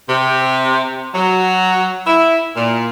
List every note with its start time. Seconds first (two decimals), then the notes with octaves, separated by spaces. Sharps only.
0.08 C3
1.14 F#3
2.07 E4
2.56 A#2